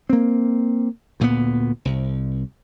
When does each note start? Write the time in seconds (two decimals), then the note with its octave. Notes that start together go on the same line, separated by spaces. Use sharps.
0.09 A#3 C4
1.20 D2 A#2 A3 B3
1.85 C2